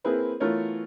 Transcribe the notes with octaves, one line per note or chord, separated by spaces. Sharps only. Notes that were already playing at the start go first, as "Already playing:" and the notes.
A#3 C4 E4 G#4 B4 C5
E3 A3 B3 F4 A#4 C#5